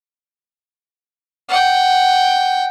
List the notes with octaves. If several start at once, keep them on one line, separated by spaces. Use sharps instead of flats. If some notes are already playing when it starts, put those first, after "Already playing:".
F#5 G5